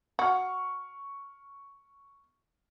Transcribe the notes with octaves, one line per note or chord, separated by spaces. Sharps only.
F#4 C#6 F6